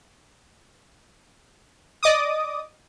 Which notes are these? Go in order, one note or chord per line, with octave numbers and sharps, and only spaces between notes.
D5 D#5 D6 D#6